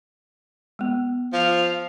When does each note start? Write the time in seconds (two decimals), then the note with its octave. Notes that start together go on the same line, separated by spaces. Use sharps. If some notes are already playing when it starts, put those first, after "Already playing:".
0.79 G#3 B3
1.33 F3 F5